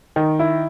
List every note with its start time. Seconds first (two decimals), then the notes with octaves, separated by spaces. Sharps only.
0.16 D#3
0.39 E4